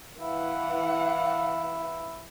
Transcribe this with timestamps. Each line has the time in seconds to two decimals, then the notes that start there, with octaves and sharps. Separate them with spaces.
0.21 E3 E4 F5 F#5